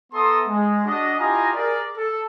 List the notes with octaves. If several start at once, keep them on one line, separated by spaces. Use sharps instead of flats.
B3 A4 E5 A#5 C6 D#6
G#3
D4 F#4 D#5
E4 F4 G4 D#5 G#5 A#5
G#4 A#4 D5
A4